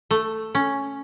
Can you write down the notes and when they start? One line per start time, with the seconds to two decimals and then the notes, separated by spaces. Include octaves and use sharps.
0.11 A3
0.55 C#4